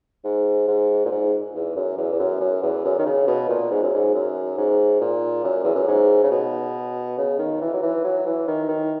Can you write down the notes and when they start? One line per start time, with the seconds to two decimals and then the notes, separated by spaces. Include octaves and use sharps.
0.24 G#2
0.68 G#2
1.05 A#2
1.11 G#2
1.55 E2
1.76 F#2
1.97 E2
2.12 E2
2.19 F#2
2.41 F#2
2.62 E2
2.85 F#2
2.99 D#3
3.06 C#3
3.27 B2
3.49 A#2
3.71 G#2
3.83 F#2
3.94 G#2
4.14 F#2
4.58 G#2
5.01 A#2
5.44 F#2
5.64 E2
5.75 F#2
5.87 G#2
6.23 C#3
6.31 B2
7.18 C#3
7.39 D#3
7.61 E3
7.74 F#3
7.83 E3
8.04 F#3
8.26 E3
8.48 D#3
8.69 D#3